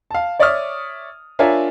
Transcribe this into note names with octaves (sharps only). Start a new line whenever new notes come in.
F5 A5
C#5 D5 E5 C#6 D#6 F6
D4 F4 A#4 C#5 E5 G#5